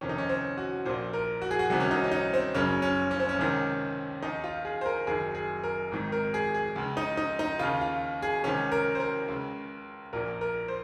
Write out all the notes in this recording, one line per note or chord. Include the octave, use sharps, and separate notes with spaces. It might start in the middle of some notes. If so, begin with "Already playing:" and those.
F1 F2 C3 D#3 C#4
D#4
C#4
C4
F#4
A#1 A#2 C5
A#4
F#4
G#4
F#4
C2 C3 D#3 F#4
C#4
D#4
C#4
D#4
C4
F#1 F#2 C#3 C#4
C#4
C#4
C4
C#4
C#2 C3 D#3
D#2 D#3 D#4
F4
G#4
C5
A#4
F#1 F#2 D#3 G#4
G#4
A#4
G#1 G#2 D#3
A#4
G#4
G#4
C#2 C#3
D#4
D#4
D#4
D#2 C#3 F4
F4
G#4
C#2 C3 D#3 C#4
A#4
C5
A#4
C#2 C#3
A#1 A#2 A#4
A#4
C5